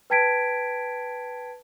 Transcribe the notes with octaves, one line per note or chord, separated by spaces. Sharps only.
B4 G5 A5 G#6 B6 D7